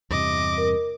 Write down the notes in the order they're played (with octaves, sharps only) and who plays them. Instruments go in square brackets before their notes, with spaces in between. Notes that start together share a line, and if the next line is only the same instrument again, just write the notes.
[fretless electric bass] E2 G2 C3 [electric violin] D#5 D6
[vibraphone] A#4